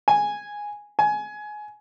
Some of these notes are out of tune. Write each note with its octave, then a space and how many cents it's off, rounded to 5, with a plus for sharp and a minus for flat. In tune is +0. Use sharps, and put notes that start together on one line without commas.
G#5 -5
G#5 +20